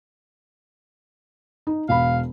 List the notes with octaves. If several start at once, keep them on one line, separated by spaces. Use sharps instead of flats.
D#4
E1 F5 B5